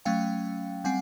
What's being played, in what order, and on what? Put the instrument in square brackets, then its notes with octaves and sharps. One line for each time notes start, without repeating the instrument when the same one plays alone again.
[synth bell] F#3 A3 C#4 F5 G5
G3 C4 F#5 G#5